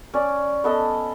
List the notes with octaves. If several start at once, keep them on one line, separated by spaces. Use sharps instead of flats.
C#4 D5
B3 A4 D#5